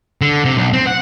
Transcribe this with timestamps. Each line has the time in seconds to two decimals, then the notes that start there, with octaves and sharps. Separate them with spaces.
0.21 D3
0.45 C3
0.57 B1
0.73 C4
0.87 F#5